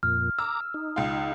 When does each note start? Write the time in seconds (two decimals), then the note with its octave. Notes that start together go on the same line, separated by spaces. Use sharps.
0.03 F2 A#2 F6
0.39 A#5 D6 E6
0.74 D#4
0.96 C#2 F4